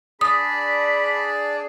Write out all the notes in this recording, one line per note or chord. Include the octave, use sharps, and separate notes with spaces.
D4 G#4 D5 B5 D#6